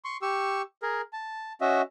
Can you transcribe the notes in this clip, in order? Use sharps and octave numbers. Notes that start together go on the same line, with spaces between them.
C6 C#6
G4 C#6 E6
G#4 A#4
A5
C#4 F#4 D#5 E5